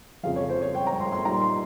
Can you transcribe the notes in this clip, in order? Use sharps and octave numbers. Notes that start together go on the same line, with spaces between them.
F2 C#3 F3 F5
C#5
C5
C#5
G5
A#5
C6
C6
A#2 G3 A#3 D#4 A#5
C6